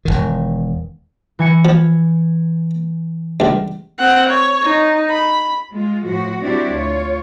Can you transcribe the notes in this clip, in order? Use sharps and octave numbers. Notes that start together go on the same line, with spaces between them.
E1 C2 D#3
E3 G#5 C#7
F3
C#2 G2
C4 F#5
C#5
D#4
B5
G#3 F4
A2 F3 F#4
G3 C4 D4 E4 F#4 G4
D2 F4 C#5